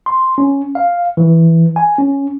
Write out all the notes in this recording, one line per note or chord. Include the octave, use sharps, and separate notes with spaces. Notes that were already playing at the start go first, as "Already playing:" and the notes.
C6
C#4
F5
E3
G#5
C#4